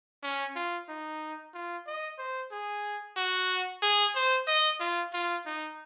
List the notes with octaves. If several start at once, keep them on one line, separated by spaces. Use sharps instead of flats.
C#4
F4
D#4
F4
D#5
C5
G#4
F#4
G#4
C5
D#5
F4
F4
D#4